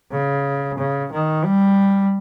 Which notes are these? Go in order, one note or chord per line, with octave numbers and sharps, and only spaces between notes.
C#3
C#3
D#3
G3